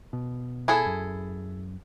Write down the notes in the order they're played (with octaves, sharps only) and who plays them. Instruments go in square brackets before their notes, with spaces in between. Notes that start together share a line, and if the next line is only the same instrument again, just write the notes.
[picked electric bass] B2
[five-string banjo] E4 G#4 A4
[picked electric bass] F#2